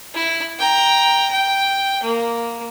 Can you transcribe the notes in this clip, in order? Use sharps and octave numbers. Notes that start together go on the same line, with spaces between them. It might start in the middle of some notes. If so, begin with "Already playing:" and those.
E4
G5 A#5
G5
A#3